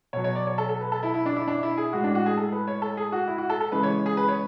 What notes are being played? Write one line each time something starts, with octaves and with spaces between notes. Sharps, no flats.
B2 F#3 C#5
C#5
D5
C#5
A4
A4
B4
A4
E4
E4
D4
E4
D4
E4
G#4
A2 G#3 F#4
D4
F#4
G#4
A4
B4
C#5
A4
G#4
F#4
E4
F#4
A4
A4
C#3 E3 G#3 B4
C#5
G#4
B4
C#5